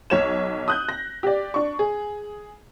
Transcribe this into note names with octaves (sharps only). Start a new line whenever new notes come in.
B1 C#5 E7
D#6 F#6 G6
A#6
G4 D5
D4 C#6
G#4